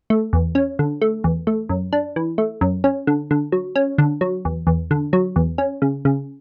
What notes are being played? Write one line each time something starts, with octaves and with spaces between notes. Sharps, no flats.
A3
E2
C#4
D3
A3
E2
A3
F#2
D4
E3
A3
F#2
C#4
D3
D3
F#3
C#4
D3
F#3
E2
E2
D3
F#3
E2
C#4
C#3
C#3